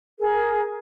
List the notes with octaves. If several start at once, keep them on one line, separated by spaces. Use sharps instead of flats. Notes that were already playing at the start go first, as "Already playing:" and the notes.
G#4 A#4